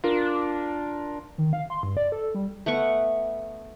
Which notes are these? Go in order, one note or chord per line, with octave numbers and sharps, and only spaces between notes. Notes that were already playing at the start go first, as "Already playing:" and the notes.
D4 F4 A#4
D#3
F5
C6
G2
D5
A4
G3
A3 B3 F#5 C#6